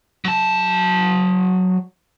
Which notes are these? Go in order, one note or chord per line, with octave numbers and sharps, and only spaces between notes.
F#3 A5